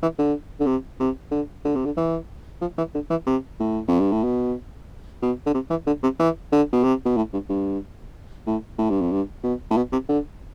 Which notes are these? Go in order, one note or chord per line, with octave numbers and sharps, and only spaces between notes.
E3
D3
D3
C3
C3
D3
D3
C3
D3
E3
F3
E3
D3
E3
C3
A2
F2
G2
A2
B2
B2
D3
C3
E3
D3
C3
E3
D3
B2
C3
B2
A2
G2
G2
A2
A2
G2
F2
G2
B2
A2
B2
C3
D3